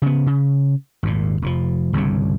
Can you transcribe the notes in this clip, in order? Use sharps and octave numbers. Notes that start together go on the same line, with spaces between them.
C#3 B3
C#3
G#1 D#2 A#2
F1 A#2 F3
G1 C2 G2 C#3